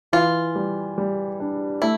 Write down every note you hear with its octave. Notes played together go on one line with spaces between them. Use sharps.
E3 F4
G3
G3
D4
A3 E4